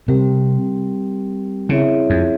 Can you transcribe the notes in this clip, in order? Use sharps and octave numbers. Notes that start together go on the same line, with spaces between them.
C3 G3 C4 G4 A#4
C#3 C4 E4 G#4 C#5 E5
F2